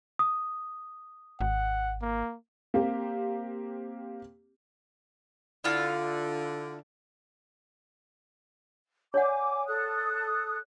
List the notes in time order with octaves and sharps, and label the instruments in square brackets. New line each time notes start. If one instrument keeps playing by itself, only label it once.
[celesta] D#6
[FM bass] G#1 [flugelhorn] F#5
[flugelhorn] A#3
[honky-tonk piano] A#3 C4 G4
[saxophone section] D3 [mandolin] E4 F4 F5
[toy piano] C#5 D5 F#5 [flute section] G#5 D6
[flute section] A4 D#6 F#6